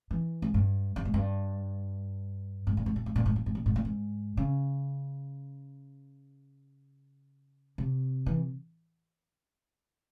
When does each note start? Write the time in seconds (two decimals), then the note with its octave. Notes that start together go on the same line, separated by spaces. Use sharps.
0.11 E3
0.42 G#2
0.54 G2
0.96 G2
1.05 G#2
1.14 G2
2.67 G#2
2.77 A#2
2.86 G#2
2.96 A#2
3.06 G#2
3.16 A#2
3.26 G#2
3.36 A#2
3.46 G#2
3.55 A#2
3.66 G#2
3.76 A#2
3.85 G#2
4.37 C#3
7.78 C3
8.26 E3